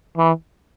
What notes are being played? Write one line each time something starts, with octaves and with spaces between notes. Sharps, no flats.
E3